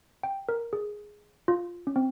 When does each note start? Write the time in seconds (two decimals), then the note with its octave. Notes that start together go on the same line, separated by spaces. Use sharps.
0.23 G5
0.49 A#4
0.73 G#4
1.48 F4
1.87 C#4
1.96 C4